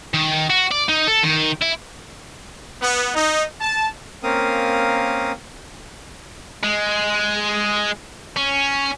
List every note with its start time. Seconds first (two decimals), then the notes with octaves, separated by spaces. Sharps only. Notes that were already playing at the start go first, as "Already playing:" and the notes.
0.14 D#3
0.50 F#4
0.71 D5
0.89 D#4
1.07 A4
1.23 D#3
1.62 E4
2.82 B3
3.15 D#4
3.61 A5
4.23 A#3 C4 C#4 A#4 F5 D#6
6.63 G#3
8.36 C#4